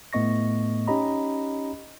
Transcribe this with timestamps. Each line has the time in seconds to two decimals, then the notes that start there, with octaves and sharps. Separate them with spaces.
0.13 A2 A3 B3 D#5 C#6 A#6
0.87 C#4 D#4 G4 D#5 A#5 B5